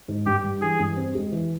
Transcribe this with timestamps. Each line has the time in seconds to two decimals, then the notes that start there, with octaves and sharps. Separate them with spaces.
0.08 G#2
0.26 G2 G4
0.44 G3
0.61 E3 G#4
0.79 G2
0.96 C4
1.15 G#3
1.32 E3